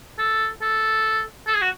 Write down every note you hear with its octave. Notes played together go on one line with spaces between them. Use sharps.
A4
A4
A4
G#4
F#4